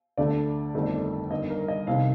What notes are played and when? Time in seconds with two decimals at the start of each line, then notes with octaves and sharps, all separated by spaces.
0.17 D2 D3 A3 D5
0.74 G1 F2 D#3 A3
1.31 G1 G2 D#3 D#5
1.50 A#4
1.68 D#5
1.87 C2 C3 D#3 F5